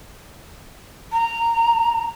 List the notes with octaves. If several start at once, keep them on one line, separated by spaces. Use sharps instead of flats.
A#5